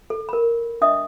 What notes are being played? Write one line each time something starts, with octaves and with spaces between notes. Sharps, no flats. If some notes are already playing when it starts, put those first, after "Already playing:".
A4
A#4 B5
D4 D#5 E5 D#6